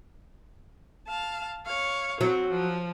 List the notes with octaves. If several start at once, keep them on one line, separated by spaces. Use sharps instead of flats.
F5 A5
C#5 F5
F#3 C4
F3